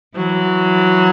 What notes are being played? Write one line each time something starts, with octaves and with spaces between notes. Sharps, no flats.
E3 F#3